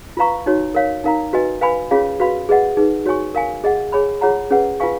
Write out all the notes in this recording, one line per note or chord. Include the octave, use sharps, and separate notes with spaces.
F4 B4 F5 A#5 C#6
D#4 F#4 C#5
A#4 C#5 F5
D#4 A#4 F5 A#5
F#4 B4 D#5 G#5
B4 F5 G#5 B5
C#4 F4 G#4 C#5 F5
F#4 B4 F5 B5
G#4 B4 D#5 F#5
D#4 G#4 B4
F#4 C#5 G#5 C#6
A#4 F5 G#5
G#4 D#5 F#5
G#4 C#5 G#5 B5
F4 G#4 C#5 F#5 A#5
C#4 G#4 B4 F#5
F4 B4 F5 G#5 C#6